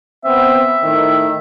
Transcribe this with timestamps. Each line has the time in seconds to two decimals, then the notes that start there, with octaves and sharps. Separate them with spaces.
0.24 B3 C4 E5
0.82 A2 D#3